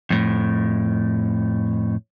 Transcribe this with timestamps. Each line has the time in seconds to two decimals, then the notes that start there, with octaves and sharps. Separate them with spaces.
0.10 F2 A2